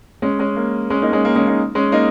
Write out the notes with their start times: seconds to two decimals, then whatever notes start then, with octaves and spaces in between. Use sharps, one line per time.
0.22 G#3 C#4
0.39 G#3 C#4
0.56 A#3
0.90 G#3 C#4
1.02 A#3 D#4
1.13 G#3 C#4
1.25 A#3
1.36 G#3 C#4
1.47 A#3 D#4
1.75 G#3 C#4
1.92 A#3 D#4